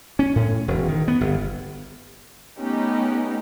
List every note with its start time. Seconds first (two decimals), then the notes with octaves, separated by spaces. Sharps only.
0.19 C#4
0.35 A2
0.68 E1
0.88 D#3
1.08 B3
1.21 G1
2.58 A3 B3 C#4 D#4 G4